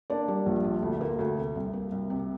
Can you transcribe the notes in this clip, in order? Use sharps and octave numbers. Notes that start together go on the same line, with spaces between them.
A#3 D4 D5
G3
A#1
A#2
D2
A#3
D2
C3
C2
A#3
C2
C3